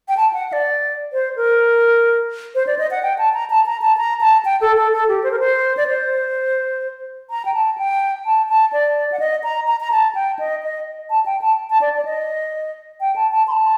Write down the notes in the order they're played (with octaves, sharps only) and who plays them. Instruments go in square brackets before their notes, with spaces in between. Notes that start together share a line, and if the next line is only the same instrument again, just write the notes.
[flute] G5
A5
F#5
F#5
D5
C5
A#4
C5
D5
D#5
F#5
G5
A5
A#5
A5
A#5
A5
A#5
A5
G5
A4
A4
A4
G4
C5
A#4
C5
D5
C5
A#5
G5
A5
G5
A5
A5
D5
F#5
D#5
A#5
A#5
A#5
A5
G5
D#5
D#5
A5
G5
A5
A5
D5
D5
D#5
G5
A5
A5
C6
A5